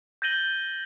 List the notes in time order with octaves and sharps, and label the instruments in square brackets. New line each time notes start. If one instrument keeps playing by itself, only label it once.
[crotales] G6 A6 A#6 D#7 F#7 G7